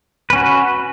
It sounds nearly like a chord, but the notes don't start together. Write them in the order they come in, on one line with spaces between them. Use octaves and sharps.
B4 C#4 F#4